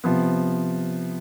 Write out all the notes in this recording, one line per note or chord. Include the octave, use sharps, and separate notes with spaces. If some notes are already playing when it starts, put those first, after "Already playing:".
C3 F3 B3